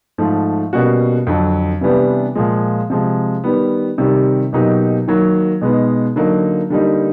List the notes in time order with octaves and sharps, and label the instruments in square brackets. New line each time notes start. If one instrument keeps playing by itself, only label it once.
[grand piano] G#2 F3 A3
B2 G3 A#3 C#4 F#4
F2 D3 F#3
C3 E3 G3 B3 D4
A#2 F3 G#3
C3 F3 G#3
D#3 G3 B3
C3 D#3 G3
B2 F#3 A#3 D#4 G4
D#3 F#3 A#3
B2 G#3 B3 D#4
D3 F#3 A#3 D#4
D3 G3 A#3 D#4